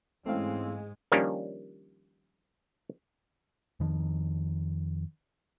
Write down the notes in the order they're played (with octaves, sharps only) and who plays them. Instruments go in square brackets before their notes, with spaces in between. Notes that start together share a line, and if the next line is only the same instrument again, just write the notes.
[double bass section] G#2 G#3 [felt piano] E3 C#4 [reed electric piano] A3 F5 [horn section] C4
[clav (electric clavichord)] D#3 F3 G3 A#3 C#4 D4
[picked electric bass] F2 D#3 F3